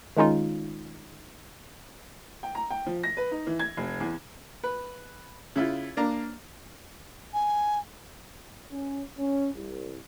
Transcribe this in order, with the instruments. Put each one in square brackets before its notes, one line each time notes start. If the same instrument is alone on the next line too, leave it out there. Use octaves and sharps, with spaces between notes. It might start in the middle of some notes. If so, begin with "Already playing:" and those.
[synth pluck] D#3 G#3 C#4 D#4 F4
[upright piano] G5
A#5
G5
F3
A#6
B4
D#4
E3
G#6
F1
E2
[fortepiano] B4
C#3 E4 F4
A#3 D4 A#5
[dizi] G#5
[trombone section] C#4
C#4
C2